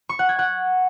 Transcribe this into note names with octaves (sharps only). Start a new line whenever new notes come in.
C#6
F#5
G#6
F#5